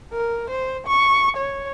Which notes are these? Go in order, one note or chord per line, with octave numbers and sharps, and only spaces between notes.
A#4
C5
C#6
C#5